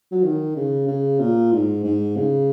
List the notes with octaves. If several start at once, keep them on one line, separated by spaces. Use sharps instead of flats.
F#3
D#3
C#3
C#3
A#2
G#2
G#2
C#3